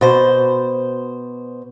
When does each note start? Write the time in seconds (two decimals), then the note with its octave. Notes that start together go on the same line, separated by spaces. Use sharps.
0.01 B2 C5